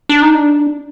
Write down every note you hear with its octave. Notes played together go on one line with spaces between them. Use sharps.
D4
D#4
D4